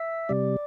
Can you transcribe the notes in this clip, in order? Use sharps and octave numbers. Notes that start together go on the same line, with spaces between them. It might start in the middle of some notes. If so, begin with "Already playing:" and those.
Already playing: E5
C3 G3 D5